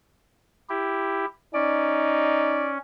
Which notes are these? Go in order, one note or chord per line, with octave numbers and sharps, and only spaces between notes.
E4 G4
C#4 D#4 D5